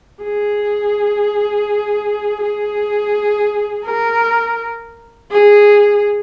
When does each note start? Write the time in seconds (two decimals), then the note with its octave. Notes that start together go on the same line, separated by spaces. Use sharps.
0.24 G#4
2.41 G#4
3.86 A#4
5.31 G#4